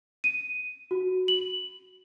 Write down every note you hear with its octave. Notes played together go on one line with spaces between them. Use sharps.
D#7
F#4
F#7